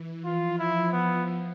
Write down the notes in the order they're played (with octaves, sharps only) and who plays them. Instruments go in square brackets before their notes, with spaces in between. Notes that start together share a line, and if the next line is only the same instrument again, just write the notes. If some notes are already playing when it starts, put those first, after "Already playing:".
Already playing: [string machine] E3
[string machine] F3 [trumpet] F4
[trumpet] E4
B3